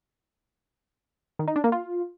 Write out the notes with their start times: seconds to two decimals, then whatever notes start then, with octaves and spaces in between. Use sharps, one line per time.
1.39 D#3
1.48 D#4
1.56 D4
1.64 A#3
1.72 F4